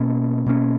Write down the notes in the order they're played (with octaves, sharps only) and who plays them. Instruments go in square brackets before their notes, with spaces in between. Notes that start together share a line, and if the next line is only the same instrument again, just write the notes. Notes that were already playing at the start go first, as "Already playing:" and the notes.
Already playing: [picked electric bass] B2 A#3 C#4
B2 A#3 C#4